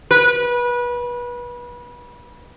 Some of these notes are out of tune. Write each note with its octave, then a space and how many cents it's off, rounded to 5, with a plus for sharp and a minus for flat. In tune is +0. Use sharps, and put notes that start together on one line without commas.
B4 -25